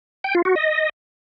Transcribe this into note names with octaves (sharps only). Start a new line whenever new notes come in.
G5
F4
F#4
D#5